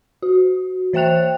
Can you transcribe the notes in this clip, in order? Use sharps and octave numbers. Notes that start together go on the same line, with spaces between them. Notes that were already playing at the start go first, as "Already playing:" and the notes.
F#4
E3 C5 E5 G5 F#6 F7